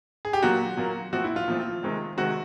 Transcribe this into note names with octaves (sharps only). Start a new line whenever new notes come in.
G#4
G4
A#2 F#3 A#3 F#4
A#2 F#3 A#3
A#2 F3 A3 C4 F#4
E4
F4
A#2 F3 A3 C4
C3 D#3 G#3 C4
C3 D#3 G#3 C4 F#4